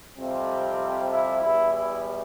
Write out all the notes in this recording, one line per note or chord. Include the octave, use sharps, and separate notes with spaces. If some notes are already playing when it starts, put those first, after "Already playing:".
F2 C3 G3 C4
E4
E2 B2 G3 E4
E4